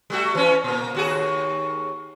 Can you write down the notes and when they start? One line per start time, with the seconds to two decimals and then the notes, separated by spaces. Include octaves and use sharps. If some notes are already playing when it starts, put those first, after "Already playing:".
0.10 G3 A3 F#4
0.35 E3 C#4
0.64 A#2 A#3
0.95 D#2 F#4 G#4